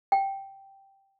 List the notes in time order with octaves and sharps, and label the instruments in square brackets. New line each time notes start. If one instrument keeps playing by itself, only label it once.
[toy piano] G5